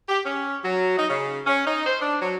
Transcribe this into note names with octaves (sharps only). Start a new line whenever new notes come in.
G4
C#4
F#3
D#4
C#3
C#4
D#4
C5
D4
F#3